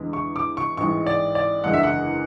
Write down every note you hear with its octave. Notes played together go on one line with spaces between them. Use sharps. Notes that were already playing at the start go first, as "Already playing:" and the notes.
Already playing: E2 D3 G#3
C#6
D6
C#6
A1 G#2 E3 G#3 C#6
D5
D5
F#1 E2 D3 G#3 F#5
E5
F#5